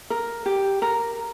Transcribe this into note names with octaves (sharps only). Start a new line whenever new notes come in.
A#4
G4
A#4